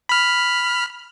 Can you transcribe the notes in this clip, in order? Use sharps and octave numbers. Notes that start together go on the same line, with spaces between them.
B5 F6